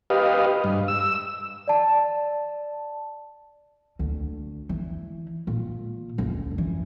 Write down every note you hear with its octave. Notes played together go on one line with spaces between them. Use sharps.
G4 B4 D#5 F5
G2
E6
D5 A5
D2
E3
A#2
F#1 D2
E3